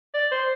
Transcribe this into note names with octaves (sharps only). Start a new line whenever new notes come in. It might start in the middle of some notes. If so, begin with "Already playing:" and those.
D5
C5